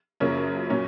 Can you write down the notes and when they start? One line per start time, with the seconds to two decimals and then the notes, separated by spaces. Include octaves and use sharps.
0.20 F#2 C#3 F3 A#3 C#4
0.70 A#2 F#3 C#4